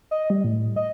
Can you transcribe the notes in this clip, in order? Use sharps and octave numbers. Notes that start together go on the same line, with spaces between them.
D#5
G3
A2
D#5